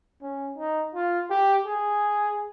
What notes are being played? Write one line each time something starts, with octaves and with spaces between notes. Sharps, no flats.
C#4
D#4
F4
G4
G#4